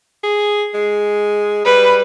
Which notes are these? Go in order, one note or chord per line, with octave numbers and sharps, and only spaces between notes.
G#4
G#3
G3 B4